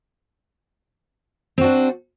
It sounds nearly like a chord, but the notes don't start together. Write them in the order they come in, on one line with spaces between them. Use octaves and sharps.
C4 F#4 D4